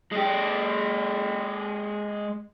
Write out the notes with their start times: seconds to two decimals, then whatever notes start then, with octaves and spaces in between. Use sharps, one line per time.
0.12 G#3 G4